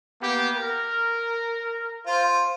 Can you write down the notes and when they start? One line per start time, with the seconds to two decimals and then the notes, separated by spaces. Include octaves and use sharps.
0.21 A#3 B3 G4
0.56 A#4
2.07 F4 C5